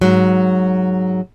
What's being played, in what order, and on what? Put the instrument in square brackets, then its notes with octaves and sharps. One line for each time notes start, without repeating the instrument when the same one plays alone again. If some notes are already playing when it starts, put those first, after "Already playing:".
[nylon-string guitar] G#2 F#3